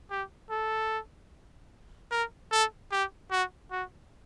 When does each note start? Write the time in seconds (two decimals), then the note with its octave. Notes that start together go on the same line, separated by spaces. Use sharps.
0.11 G4
0.50 A4
2.11 A#4
2.52 A4
2.92 G4
3.31 F#4
3.71 F#4